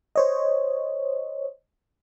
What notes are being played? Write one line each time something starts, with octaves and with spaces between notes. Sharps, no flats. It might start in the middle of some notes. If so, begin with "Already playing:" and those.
C5 C#5 D#5